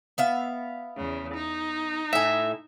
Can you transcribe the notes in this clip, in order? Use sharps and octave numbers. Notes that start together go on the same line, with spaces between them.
B3 E5 F5
E2 C#3
D#4
A2 E5 G#5